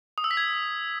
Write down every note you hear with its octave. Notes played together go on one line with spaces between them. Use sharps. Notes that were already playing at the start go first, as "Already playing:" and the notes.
D#6
E6
B6
G#6